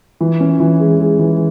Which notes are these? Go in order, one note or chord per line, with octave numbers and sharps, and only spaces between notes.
E3
C#4
E3
G#3
G#3
E3